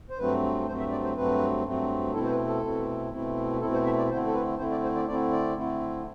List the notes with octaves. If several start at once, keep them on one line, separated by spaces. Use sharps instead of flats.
C5
G2 F#3 A3 C4 B4
G2 F#3 A3 C4 C5
E5
D5
C5
G2 F#3 A3 C4 B4
G2 F#3 A3 C4
B2 A3 C4 E4 A4
C5
B4
A4
B2 A3 C4 E4
B2 A3 C4 E4
B2 A3 C4 E4 A4
C5
E5
D5
D3 A3 C4 E4 C5
A4
B4
D3 A3 C4 E4 C5
D5
C5
D5
D3 A3 C4 E4 D5
D5
D3 A3 C4 E4